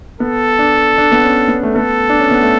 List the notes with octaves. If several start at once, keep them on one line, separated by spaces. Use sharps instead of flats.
B3 A4
D4
D4
B3
C#4
B3
A3
B3 A4
D4
C#4
B3
A3